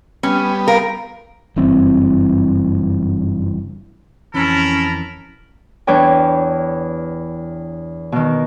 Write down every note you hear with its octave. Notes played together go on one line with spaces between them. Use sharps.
G3 B3 C#4
A#4 F5
F#1 G2 E3 C4
F2 E3 C#4 A4 A#4 B5
E2 D4 B4 C#5 G5
B2 D#3